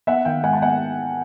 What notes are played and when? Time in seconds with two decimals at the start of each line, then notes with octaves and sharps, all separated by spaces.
0.07 B3 E5 F#5
0.25 D#3 F5 G5
0.43 G#2 F#5 G#5
0.53 A5
0.61 B3 F#5 G#5